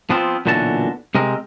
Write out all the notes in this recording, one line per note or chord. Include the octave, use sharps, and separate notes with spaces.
F3 B3 C4 F4
B1 A#2 D3 E3 F#4 A5
C3 G#3 C4 A#4